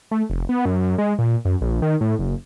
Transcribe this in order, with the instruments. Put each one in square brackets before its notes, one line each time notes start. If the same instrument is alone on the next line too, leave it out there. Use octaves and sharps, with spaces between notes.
[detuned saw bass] A3
F1
B3
F#2
F#2
G#3
A#2
F#2
A#1
D#3
A2
F#1